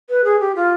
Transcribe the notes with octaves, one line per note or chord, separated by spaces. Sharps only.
B4
G#4
G4
F4